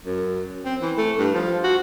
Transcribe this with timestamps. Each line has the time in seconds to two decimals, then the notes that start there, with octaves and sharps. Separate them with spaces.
0.05 F#2
0.65 C4
0.82 E3
0.97 A3
1.19 G2
1.35 F3
1.64 F#4